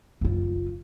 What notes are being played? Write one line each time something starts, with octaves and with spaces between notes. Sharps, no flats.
F#1 F4